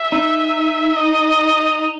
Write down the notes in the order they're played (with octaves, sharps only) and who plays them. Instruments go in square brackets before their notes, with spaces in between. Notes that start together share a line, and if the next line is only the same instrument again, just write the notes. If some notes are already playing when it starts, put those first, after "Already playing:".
Already playing: [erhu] E5
[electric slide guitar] D#4
[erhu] D#5